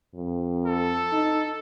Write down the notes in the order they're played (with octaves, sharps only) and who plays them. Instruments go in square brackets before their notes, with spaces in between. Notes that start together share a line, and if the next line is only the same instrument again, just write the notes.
[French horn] F2
[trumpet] A4
[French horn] D#4